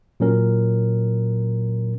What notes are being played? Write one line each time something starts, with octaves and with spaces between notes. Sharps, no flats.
A#2 F#3 C#4 A#4